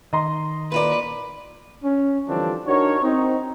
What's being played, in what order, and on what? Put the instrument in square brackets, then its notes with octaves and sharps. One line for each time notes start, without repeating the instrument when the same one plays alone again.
[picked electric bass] D#3 [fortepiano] D#5 A#5 C6
[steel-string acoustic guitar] A#2 A#3 D5 [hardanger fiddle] B4
[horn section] C#4
D3 E3 F3 G3 C4 D4
D4 D#4 F#4 A#4 C#5
C4 D#4